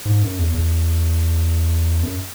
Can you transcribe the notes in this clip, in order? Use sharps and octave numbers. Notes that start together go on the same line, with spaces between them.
G#2
F#2
E2
E2
F#2